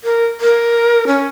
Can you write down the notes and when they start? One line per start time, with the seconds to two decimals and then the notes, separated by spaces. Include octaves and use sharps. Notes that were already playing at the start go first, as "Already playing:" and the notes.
0.04 A#4
0.41 A#4
1.07 C#4